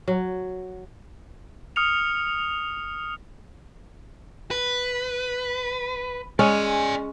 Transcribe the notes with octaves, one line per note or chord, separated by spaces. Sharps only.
F#3
D#6 F6 C#7 F7
B4
G#3 C#4 C#5 D5 G#5